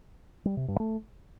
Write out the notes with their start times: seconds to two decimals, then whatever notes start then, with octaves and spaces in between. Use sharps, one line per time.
0.45 G3
0.57 C3
0.68 G2
0.80 A3